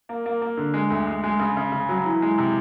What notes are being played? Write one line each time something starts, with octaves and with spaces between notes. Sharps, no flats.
A#3
A#3
A#3
D3
G#3
D2
G#3
G#3
C#3
C#3
C#3
F#3
E3
G#3
C3